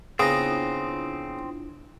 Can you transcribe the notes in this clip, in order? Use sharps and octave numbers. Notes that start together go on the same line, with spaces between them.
C#3 B3 C4 D4 E4 F4 D#6 A#6